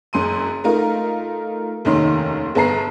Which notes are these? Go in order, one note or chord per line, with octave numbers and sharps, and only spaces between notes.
F#1 F#2 C6 D#7
A3 D#4 F4 A#4
F1 D#2 D#3 C#4 D#4 C6
G1 G#4 B4 A5 A#5 C7